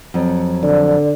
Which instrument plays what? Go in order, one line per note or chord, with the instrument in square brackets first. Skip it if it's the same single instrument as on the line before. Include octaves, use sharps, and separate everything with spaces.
[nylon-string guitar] F2 F#3
[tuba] D3 [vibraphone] D5